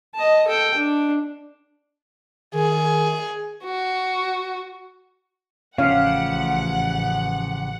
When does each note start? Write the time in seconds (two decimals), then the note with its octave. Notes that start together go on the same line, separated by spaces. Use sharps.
0.15 D#5 A5
0.47 A4 G5
0.76 D4
2.55 D#3 G#4
3.65 F#4
5.78 A1 C#3 F3 C#4 G4 F5 F#5